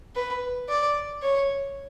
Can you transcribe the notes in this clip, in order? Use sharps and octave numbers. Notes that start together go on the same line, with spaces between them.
B4
D5
C#5